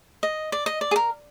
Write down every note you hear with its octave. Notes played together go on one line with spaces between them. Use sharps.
D#5
D5
D#5
D5
G#4
A#4